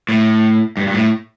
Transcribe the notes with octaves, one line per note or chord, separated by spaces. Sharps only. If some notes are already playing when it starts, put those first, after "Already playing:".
A2
G2
G2
A2